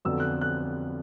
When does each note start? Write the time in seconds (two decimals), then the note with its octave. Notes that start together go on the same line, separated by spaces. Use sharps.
0.05 F2 D3 F#3 B3 E6
0.20 F#6
0.41 F#6